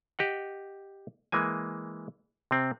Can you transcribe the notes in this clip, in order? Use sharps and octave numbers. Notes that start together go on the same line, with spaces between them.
G4 D#5 F#5
E3 G#3 A#3 G#5
C3 C4